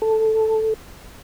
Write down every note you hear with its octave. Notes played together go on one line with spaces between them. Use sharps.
A4